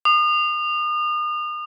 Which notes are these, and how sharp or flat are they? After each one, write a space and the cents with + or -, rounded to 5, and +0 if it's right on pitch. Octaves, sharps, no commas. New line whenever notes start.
D#6 -40